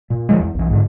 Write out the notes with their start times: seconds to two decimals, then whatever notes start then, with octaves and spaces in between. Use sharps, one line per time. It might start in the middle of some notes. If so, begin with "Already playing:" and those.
0.10 A#2
0.29 D#3 F3 G#3
0.40 E2
0.55 B1 E3
0.70 G#2 D3